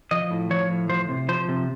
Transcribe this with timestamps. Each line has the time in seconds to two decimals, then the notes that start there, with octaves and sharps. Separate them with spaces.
0.11 F3 D#5
0.31 A2
0.50 F3 C#5
0.70 A2
0.89 F3 C5
1.09 C3
1.29 F3 C5
1.49 C3